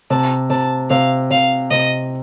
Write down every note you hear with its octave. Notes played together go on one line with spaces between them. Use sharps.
C3 A5
C3 A5
C3 F5
C3 F5
C3 D#5